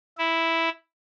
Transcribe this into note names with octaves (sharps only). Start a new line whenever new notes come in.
E4